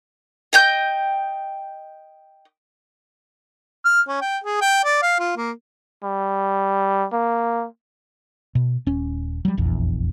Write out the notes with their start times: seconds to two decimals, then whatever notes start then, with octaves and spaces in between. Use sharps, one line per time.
0.53 D#5 G5 G6
3.85 F6
4.08 C#4
4.21 G5
4.44 G#4
4.61 G5
4.85 D5
5.02 F5
5.19 F4
5.37 A#3
6.04 G3
7.12 A#3
8.55 B2
8.86 D#1 C#4
9.45 F#3 G3
9.57 F1 A#1 E2